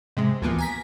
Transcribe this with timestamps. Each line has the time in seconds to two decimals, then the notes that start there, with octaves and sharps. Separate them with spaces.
0.17 G#2 C3 G#3
0.42 D2 E3 F3 A#3 B3
0.58 G#5 A#5 B6